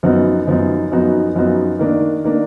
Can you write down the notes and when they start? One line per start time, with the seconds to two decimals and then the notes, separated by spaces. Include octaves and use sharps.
0.03 F#2 F3 B3 D#4 F#4
0.47 F#2 F3 B3 D#4 F#4
0.91 F#2 F3 B3 D#4 F#4
1.35 F#2 F3 B3 D#4 F#4
1.79 D#3 A#3 D4
2.24 D#3 A#3 D4